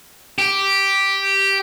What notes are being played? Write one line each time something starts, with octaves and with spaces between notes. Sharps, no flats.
G4